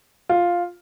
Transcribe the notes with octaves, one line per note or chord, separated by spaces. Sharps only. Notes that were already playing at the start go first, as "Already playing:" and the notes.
F4